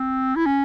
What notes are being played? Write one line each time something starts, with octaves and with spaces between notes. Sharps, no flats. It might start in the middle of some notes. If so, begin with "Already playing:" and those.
Already playing: C4
E4
C#4